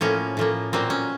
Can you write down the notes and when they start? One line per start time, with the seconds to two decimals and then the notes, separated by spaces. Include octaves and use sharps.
0.01 A2 F3 A#3 C#4
0.37 A2 F3 A#3
0.73 A#2 F#3 A#3 C4
0.90 C#4